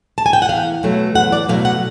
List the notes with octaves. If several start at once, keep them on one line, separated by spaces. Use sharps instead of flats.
A5
G#5
G5
F#5
E2 F5
B2 F#3 A3
E2 F#5
D5
B2 F#3 A3 F5
F#5